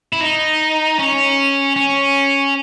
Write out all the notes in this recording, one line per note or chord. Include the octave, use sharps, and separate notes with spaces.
E4
D#4
C#4
C#4